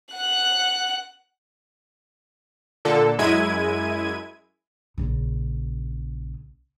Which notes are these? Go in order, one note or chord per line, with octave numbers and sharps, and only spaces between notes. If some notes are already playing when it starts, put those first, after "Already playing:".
F#5 F#6
A#2 D3 A4
F#2 G#3 E4 G#6 D#7
A#1 C#3